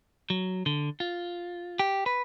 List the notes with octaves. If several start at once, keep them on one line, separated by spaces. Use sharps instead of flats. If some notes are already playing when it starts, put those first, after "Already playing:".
F#3
D3
F4
G4
B4